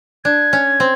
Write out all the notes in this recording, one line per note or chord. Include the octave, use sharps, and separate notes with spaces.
D4 G#6
C#4
C4